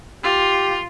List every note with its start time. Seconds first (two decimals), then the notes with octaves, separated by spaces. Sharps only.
0.23 F4 G4